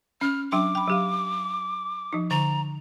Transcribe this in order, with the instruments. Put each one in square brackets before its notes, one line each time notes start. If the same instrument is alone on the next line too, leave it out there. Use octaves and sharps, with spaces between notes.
[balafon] C#4 [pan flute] F6
[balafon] F#3 D4 G5 [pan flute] D6
[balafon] G5 B5
F#3 G4 F5
F3 D#4
[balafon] D3 [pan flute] A#5